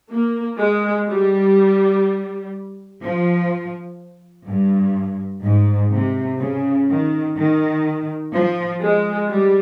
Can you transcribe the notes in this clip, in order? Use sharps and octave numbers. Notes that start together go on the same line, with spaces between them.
A#3
G#3
G3
F3
G2
G#2
C3
C#3
D#3
D#3
F3
G#3
G3